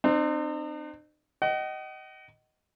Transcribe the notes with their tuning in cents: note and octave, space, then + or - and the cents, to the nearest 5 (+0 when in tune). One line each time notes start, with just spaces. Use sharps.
C4 +0 D#4 -45
D#5 +0 F#5 +45